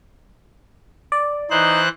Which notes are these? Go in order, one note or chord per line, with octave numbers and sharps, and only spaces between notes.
D5
E3 D#4 C5 F#6